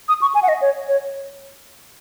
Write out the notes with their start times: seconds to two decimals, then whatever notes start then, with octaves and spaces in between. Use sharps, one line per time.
0.08 D#6
0.22 C#6
0.35 G#5
0.43 F#5
0.48 D#5
0.61 C#5
0.88 C#5